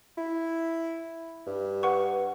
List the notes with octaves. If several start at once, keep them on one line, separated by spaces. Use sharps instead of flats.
E4
G2
B4 F#5 C#6